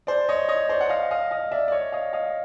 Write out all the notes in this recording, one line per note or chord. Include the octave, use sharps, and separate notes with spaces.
C5 D5
C#5 D#5
C#5 D#5
C5 D5
F#5
D#5 F5
D#5 F5
D#5 F5
D5 E5
D5
C#5 D#5
D#5 F5
D#5 F5